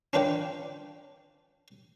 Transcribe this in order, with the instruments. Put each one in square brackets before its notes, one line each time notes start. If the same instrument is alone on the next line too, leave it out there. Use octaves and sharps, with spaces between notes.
[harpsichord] C#4 D4 F4 B4 D5 G5